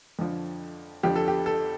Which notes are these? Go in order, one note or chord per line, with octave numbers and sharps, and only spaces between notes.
F2 D3 F3
F2 D3 F3 G4
A4
G4
A4